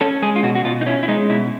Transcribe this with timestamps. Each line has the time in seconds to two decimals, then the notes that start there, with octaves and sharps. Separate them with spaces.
0.01 C#4 A4
0.22 G#3 G#4
0.36 F4
0.43 B2 F#4
0.55 F#4
0.65 B2 F4
0.81 D#4
0.86 C#4 E4
1.03 E4
1.08 G#3 D#4
1.30 B2 E4